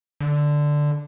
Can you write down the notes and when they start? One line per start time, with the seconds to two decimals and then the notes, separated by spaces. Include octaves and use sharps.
0.21 D3